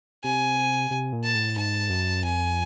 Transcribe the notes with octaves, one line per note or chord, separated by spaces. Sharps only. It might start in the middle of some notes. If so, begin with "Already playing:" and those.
C3 G#5
C3
A#2
A5
A2
G#2 A5
F#2
F2 G#5